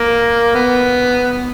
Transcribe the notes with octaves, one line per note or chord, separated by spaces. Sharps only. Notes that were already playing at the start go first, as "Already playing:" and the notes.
Already playing: A#3
B3